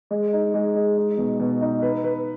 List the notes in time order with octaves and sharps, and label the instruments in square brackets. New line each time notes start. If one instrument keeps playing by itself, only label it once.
[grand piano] G#3
D#4
G#3
G#3
D#4
B2
B2
D#4
B4
B4